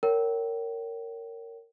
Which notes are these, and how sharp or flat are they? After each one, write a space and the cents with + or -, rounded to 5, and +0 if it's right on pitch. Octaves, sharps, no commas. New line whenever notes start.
A#4 -15 C#5 +15 G5 -30